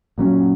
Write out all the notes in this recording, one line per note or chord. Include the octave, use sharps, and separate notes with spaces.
A#2 F#3 C#4